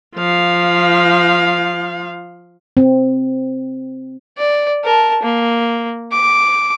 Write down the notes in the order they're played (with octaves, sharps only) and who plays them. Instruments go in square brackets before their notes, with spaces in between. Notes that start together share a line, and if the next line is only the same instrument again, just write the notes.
[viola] F3 F5
[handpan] C4
[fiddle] D5
A#4 A5
A#3
D6